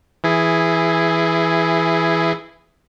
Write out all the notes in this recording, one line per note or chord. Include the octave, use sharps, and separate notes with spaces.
E3 E4 G#4